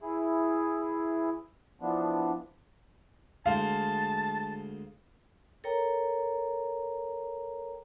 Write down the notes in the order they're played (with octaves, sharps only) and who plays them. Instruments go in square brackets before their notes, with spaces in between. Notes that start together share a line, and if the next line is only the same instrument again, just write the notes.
[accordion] E3 E4 G#4
E3 F3 B3 D4
[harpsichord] D2 G#3 C5 [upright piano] F5 [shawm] A5
[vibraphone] A4 A#4 C#5 G5 A#5